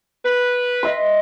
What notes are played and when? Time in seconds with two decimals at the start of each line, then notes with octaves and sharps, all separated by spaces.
0.25 B4
0.83 D#5 E5 C6